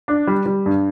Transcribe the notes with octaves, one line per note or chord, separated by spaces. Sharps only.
D4
G3
G3
G2